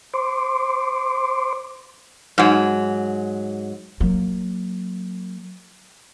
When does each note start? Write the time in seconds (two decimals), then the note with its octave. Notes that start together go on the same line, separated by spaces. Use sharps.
0.14 C5 C6 D6
2.38 G#2 F#3
4.00 F#3 A#3